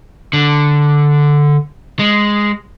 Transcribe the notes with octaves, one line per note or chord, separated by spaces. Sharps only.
D3
G#3